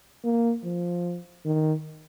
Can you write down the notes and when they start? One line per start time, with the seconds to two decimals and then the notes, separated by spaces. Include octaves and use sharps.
0.24 A#3
0.64 F3
1.45 D#3